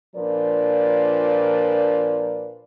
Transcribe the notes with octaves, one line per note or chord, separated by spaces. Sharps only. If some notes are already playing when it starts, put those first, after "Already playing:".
A#2 F3 D4 A#4 B4 D5